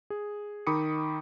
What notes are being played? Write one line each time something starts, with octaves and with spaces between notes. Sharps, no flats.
G#4
D#3 D#4 B5 D6 D#6 C#7